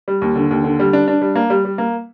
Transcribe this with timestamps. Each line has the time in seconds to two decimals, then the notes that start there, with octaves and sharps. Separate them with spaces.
0.08 G3
0.22 D#2
0.36 D3
0.51 D#2
0.64 D3
0.80 G3
0.93 D4
1.08 D4
1.22 G3
1.35 A#3
1.50 G3
1.65 G3
1.78 A#3